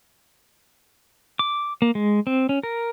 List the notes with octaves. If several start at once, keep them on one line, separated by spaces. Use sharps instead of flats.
D6
A#3
G#3
C4
C#4
A#4